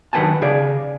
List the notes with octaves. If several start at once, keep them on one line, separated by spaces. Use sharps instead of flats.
F#2 D#3 B4 F#5 G#5 A5
C#3 G#4 D5